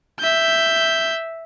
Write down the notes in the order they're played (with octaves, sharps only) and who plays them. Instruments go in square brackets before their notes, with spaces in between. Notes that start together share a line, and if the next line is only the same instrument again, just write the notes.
[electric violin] E5 G6